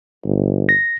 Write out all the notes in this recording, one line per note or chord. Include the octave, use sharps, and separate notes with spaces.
G1
A#6